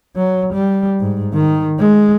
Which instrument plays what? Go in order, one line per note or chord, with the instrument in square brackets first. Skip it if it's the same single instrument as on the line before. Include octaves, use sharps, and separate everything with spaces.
[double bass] F#3
G3
G#2
D#3
G#3